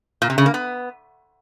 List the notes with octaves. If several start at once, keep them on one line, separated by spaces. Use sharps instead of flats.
A#2
C3
C#3
A#3
B3